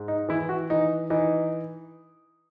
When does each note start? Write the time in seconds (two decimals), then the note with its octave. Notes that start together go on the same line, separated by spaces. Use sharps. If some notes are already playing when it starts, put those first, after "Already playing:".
Already playing: G#2
0.08 D#4
0.29 E3 E4
0.49 F#4
0.70 E3 D#4
1.10 E3 D#4